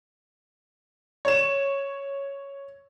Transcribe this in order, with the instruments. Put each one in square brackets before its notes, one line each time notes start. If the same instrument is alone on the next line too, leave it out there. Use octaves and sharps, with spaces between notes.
[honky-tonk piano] C#5 E7